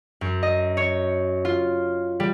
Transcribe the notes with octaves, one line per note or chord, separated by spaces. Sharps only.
F#2
D#5
C#5
F4
G3